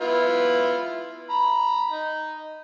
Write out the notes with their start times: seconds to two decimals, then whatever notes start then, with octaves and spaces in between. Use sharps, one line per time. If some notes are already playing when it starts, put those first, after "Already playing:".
0.01 B3 E4 F4
1.30 A#5 B5
1.92 D#4